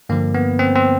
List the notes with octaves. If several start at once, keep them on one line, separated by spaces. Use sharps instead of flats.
G2 D3 F3 A#3
B3
C4
C4